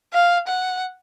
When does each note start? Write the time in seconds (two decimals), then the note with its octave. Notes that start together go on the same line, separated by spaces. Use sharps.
0.13 F5
0.48 F#5